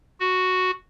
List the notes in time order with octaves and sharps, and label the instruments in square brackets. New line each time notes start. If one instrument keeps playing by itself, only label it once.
[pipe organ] F#4